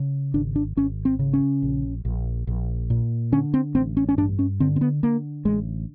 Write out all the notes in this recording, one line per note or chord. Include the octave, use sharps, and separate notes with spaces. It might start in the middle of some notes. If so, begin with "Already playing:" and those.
Already playing: C#3
G#1 D4
D4
G#1 C#4
C4
C#3
C#4
A#1
A#1
A#1
A#2
D3 C#4
C4
A1 C4
C#4
C#4
G2 D4
C#4
D3 C4
C4
B3
D3 A#3
A1 G#3